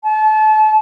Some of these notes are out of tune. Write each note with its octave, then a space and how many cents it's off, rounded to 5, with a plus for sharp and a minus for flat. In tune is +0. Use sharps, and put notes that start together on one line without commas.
A5 -30